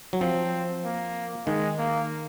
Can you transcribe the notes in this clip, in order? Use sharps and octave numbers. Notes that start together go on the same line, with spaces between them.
F#3
F3 C4
A#3
D#3 G#3
A#3